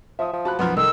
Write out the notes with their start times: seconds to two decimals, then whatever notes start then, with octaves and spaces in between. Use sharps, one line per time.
0.19 F3 E5 D#6
0.33 F3
0.45 F#4 A5 B5 F#6
0.59 B1 F#2 F3 B3 A#5 C6 F6
0.77 C2 D#3 A4 A#4 A#5 E6